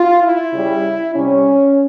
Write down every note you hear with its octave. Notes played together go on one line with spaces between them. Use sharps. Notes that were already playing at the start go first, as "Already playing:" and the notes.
Already playing: F4
E4
C#3 G3
C3 G3 C#4